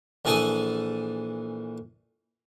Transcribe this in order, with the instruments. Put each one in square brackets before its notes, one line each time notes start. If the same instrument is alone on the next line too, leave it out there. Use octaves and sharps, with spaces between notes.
[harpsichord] A#1 E3 G#4 A4 G#5 D#6